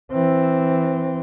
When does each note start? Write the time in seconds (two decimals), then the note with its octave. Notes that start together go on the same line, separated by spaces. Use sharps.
0.12 E3 C4